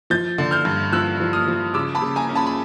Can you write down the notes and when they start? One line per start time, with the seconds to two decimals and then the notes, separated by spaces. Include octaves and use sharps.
0.10 F3 G6 A6
0.38 D3
0.51 F6 G6
0.65 G2
0.92 F3 E6 F#6
1.20 F3
1.33 D#6 F6
1.48 F3
1.74 C#3 D6 E6
1.95 A5 B5
2.02 C#3
2.16 G#5 A#5
2.29 C#4
2.35 A5 B5
2.47 B5